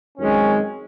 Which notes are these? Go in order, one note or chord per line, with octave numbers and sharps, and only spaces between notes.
F#2 D#3 G#3 C4 C#4